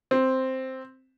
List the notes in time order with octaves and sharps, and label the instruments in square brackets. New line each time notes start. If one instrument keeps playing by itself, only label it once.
[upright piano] C4